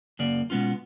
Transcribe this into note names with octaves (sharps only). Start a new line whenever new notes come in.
F#2 C#3 A#3 D5
B2 G#3 B3 C#4 F4